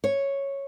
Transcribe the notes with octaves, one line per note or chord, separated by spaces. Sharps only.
C#5